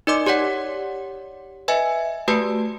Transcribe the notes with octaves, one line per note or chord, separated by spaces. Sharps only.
D#4 A#4 D5 D#5 C6 D6
G4 C#5 D5 F#5
B4 D#5 E5 G#5
A3 F#4 G4 B4 A5